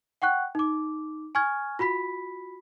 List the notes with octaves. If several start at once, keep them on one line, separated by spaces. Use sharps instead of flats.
F#5 G5 C#6 F#6
D#4 D6
G#5 C#6 F6 G#6
F4 F#4 B5 B6